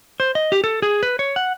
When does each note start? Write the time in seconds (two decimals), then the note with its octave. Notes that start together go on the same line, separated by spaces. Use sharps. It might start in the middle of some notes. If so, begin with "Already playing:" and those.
0.20 C5
0.35 D#5
0.52 G4
0.64 A4
0.82 G#4
1.03 B4
1.19 C#5
1.36 F#5